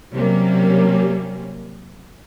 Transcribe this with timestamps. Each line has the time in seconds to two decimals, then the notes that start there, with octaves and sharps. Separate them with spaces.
0.12 C3 F#3 G3 A#3 C#4